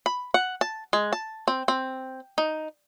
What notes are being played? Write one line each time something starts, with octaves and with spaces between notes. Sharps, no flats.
B5
F#5
A5
G#3
A5
C4
C4
D#4